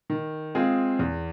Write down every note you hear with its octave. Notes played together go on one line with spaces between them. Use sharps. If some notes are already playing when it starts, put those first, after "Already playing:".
D#3
G#3 C4 F4 G#4
E2